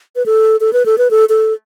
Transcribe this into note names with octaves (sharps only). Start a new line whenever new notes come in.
B4
A4
A4
B4
A4
B4
A4
A4